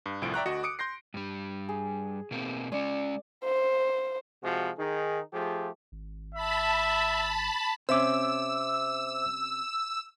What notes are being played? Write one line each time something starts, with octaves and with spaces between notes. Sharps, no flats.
G2
C2 A2 F3 D7
D5 E5 G5 A#5 C#6 F#6
D2 F#4 D#5 C#7
D6 D#6 C#7 D7
C6 G6 A#6 C7
G2 G3
G#4
B2 A#3 C4
G#3 C#4 D5
C5
C3 F3 G#3 F#4
D#3 D#4 G#4
F3 A3 F4 G4 G#4
G#1
E5 A5 B5
C3 C#4 C5 E5 D6 E6